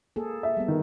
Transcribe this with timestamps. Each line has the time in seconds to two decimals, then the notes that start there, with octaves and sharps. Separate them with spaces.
0.16 A#3 G#4 A4
0.43 E5
0.57 G3 B3
0.68 D#3